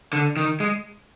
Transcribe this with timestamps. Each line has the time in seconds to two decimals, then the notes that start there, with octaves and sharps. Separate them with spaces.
0.13 D3
0.37 D#3
0.60 G#3